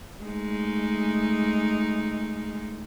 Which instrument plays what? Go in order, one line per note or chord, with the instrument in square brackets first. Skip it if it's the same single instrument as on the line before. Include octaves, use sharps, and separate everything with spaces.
[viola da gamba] G#3 A3 D#4